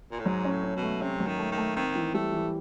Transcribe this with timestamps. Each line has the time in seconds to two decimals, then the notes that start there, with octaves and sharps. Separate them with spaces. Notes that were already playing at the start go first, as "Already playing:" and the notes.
0.11 A#2
0.19 A2
0.26 G#2 F#3
0.45 C#4
0.50 A2
0.64 C#4
0.76 B2
0.82 A3
1.01 C3 C#4
1.20 F#3
1.26 D#3
1.39 A3
1.52 D#3
1.57 A3
1.76 D#3 C4
1.96 E3
2.14 G3 A3
2.33 E3